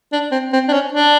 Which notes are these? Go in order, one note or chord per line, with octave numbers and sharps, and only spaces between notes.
D4
C4
C4
D4
C#4
D4